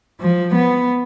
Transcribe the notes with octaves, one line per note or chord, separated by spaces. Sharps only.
F3
B3